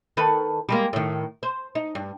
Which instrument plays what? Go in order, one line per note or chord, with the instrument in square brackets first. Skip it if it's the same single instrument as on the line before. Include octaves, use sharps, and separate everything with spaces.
[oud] D#3 A4 B4
G3 G#3 A#3
A2 D#3
C5
D#4
G2